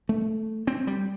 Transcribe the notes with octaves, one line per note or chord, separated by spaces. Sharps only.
A3
C4
G3